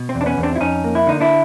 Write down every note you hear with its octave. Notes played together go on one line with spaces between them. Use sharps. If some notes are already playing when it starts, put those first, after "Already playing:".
Already playing: B2
C4
E2
D4
B3 C#4
E2
C4 D4
E4
F2 C#4 D#4
A#3
E4
D3 D#4
D4 E4